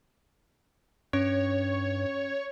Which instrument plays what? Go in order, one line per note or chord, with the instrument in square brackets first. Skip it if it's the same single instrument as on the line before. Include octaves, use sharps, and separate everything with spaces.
[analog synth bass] G2 [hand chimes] C#4 [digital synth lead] C#5